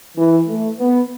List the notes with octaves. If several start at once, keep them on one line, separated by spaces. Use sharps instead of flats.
E3
A3
B3